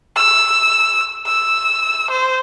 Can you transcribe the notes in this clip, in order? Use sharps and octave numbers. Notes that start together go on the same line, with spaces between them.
E6
E6
C5